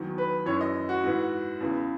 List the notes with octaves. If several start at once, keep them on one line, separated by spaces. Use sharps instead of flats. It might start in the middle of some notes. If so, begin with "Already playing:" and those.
Already playing: E2 D#3 F#3
B4
F#2 E3 C#5
D#5
F#4
G#2 E3
E2 C#3 E3